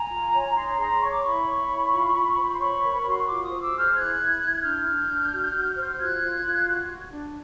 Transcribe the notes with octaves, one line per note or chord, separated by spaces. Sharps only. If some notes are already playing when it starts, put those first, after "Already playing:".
Already playing: G#5 A#5
F4
C#5
D#4 A#5 C6
G#4 A#5 C6
C#5 C#6
D6
E4 B5 C#6
C#5
E4
F4
F4
C5
C6
C#5 B5 C#6
A#4
B5
F#4 C6
C#6
F4 C6 D6
C#6 D#6
C5
D6 E6
G#4
F6 G6
E4 F#6 G#6
E4
E4
D4 F6 G6
D4
D4
F#4
F#4
C5
F4 F#6 G#6
F4
F4
F#4
F#4
D4